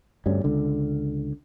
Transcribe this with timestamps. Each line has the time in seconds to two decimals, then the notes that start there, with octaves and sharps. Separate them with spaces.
0.26 D2 G2 G3 C#4
0.44 C#2 D3